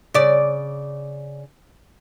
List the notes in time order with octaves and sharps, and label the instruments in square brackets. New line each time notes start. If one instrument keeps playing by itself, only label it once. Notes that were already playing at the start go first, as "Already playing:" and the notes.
[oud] C#3 D5